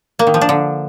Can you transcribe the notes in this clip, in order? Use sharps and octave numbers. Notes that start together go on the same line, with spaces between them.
A#3
D#3
F3
D4
D3